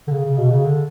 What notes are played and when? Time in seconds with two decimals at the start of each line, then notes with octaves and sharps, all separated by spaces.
0.08 D3
0.11 C#3
0.25 C#3
0.38 B2
0.51 C#3
0.64 D3